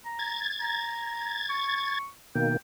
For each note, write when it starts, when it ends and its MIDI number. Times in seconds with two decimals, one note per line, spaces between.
0.06 0.41 82
0.19 1.99 92
0.19 1.99 93
0.61 1.44 82
1.50 2.08 85
2.35 2.57 47
2.35 2.57 51
2.35 2.57 58
2.35 2.55 79